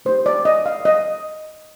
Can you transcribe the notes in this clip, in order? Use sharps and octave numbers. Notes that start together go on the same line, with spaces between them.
A3 D#4 G4 C5
D5
D#5
F5
D#5